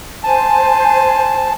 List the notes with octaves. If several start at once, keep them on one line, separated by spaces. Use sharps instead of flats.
C5 G#5 A5